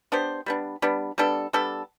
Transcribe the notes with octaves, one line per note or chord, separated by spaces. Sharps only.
B3 D4 G4 C5
G3 B3 D4
G3 B3 D4
G3 B3 D4 A4
G3 B3 D4 A4